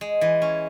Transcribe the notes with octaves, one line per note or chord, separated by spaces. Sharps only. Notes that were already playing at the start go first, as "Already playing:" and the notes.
G#3
E3
C#4